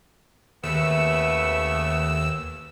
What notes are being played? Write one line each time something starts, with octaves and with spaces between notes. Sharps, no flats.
D#2 C#3 A3 B3 E6